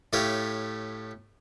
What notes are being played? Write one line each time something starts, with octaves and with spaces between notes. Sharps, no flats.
A2 A3 G4 C#5 F5